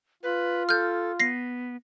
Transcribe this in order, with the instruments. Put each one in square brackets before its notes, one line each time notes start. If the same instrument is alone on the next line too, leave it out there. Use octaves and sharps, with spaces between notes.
[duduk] F4 [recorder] B4
[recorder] A4 [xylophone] F6 G6
[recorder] B3 [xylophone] A#6 C7